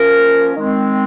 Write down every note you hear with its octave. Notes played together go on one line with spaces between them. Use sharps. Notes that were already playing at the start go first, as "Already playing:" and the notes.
Already playing: F3 A#3 C#4 A#4
D#3 G#3 C4